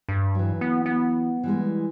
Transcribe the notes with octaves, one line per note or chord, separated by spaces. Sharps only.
G2
E3 F#3
B3
B3
E3 G3 G#3